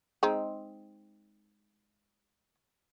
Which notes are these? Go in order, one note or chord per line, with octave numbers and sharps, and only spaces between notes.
G#3 C4 D#4